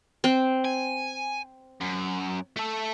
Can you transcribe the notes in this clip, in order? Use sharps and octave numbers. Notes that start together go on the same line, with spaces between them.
C4
G#5
F#2
A3 A4